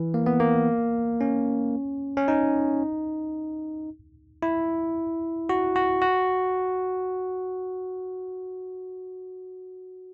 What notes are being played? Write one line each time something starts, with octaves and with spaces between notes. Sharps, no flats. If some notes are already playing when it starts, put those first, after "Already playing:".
Already playing: E3
A#3
B3
A#3
C#4
C#4
D#4
E4
F#4
F#4
F#4